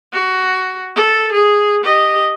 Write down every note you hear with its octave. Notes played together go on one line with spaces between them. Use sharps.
F#4
A4
G#4
G4 D#5